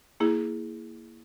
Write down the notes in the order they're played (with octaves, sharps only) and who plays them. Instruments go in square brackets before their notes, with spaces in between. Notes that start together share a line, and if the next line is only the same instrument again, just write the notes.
[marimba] A#3 E4 G#4